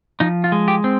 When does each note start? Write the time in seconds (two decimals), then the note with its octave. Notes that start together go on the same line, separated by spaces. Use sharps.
0.20 F3 D#4
0.44 F4
0.52 G#3
0.68 G4
0.84 C4